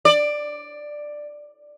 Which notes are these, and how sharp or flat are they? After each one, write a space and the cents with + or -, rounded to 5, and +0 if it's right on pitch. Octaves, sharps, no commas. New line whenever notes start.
D5 +10